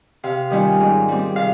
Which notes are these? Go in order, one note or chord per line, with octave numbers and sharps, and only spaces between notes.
C3 F5
D#3 G3 C#4 F4
G#2
G3 C4
C3 F5